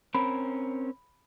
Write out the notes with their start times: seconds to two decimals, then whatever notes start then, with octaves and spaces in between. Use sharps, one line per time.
0.14 C4 C#4 A#4 B5